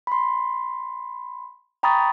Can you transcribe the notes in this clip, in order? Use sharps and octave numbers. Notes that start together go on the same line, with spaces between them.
B5 C6
G5 A#5 B5 C#6 D#6 A6